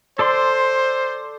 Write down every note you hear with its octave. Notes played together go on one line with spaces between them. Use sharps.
A4 C5 D5 C6